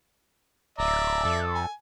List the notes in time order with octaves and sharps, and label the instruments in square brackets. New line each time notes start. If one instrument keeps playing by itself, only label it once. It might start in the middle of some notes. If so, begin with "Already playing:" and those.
[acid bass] D1 [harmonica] D5 E5 [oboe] A#5
[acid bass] F2 [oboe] A4
[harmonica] G#5